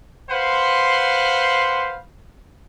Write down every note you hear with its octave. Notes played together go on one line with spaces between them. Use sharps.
B4 C5 F5 F#5 C6